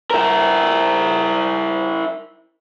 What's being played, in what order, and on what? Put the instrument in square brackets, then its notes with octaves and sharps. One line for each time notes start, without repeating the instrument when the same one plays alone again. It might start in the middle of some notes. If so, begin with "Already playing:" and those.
[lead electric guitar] E4 A#4